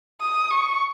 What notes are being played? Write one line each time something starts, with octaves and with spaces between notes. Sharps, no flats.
D#6
C#6